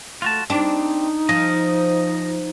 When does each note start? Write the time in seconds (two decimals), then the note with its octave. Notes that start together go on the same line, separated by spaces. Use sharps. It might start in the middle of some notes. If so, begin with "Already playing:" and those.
0.22 A3 F4 F#4 A5
0.50 C4 D4 D#4 G4
1.29 F3 D#5